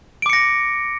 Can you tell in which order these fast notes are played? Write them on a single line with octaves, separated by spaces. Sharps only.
D7 D6 C#7 A#6